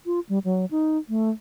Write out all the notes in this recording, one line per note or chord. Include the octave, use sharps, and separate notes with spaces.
F4
G3
F#3
D#4
A3